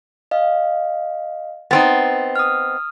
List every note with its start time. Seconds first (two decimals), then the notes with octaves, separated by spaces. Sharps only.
0.31 D#5 F5
1.71 B3 C4 D#4 A6
2.36 D#6 F6